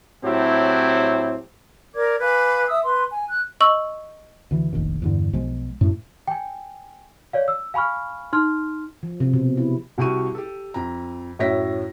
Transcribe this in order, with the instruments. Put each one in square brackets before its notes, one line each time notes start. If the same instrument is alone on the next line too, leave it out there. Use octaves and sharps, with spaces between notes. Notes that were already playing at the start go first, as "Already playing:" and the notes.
[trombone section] A2 F#3 C4 E4 G4
[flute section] A#4 D5 D6 G#6
B4 F5 G#5 D6
E5 D#6 E6
B4 C6
G#5
F#6
[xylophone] D#5 C#6 E6 F#7
[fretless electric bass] D2 E3
F1 A#1 D#2
E2 G2 D3
B1 F3 G#3
F#2 A2 A3
[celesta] G5 G#5
C#5 D5 F5
E6
F5 G#5 B5 C#6 F6
D#4 C6 F6
[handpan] F3
C3
B2
E4
[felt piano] C2 G3 F#4 G4 C#6 D#7
G4 A4
F2 A#5
F#2 A2 C#5 E5 A#6 B6